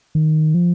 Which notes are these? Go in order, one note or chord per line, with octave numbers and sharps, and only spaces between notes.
D#3
F3